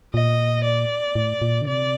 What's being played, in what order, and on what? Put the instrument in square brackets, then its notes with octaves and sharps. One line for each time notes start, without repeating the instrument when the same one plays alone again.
[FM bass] A#2 [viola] D#5
[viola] D5
[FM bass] A2
A#2
D3
[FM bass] C3 [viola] D5